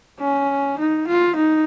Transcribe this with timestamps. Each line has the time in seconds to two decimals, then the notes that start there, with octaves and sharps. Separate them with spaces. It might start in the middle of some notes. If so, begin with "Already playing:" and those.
0.20 C#4
0.79 D#4
1.08 F4
1.36 D#4